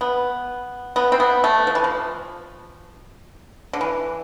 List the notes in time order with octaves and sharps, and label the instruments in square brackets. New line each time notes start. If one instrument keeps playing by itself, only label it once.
[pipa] B3
B3
C4
B3
A3
F3
E3
F3
D3
E3